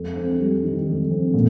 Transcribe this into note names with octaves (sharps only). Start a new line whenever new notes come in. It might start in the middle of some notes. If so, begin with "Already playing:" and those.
Already playing: F2
C4
G3
D#3
F2
C4
A#2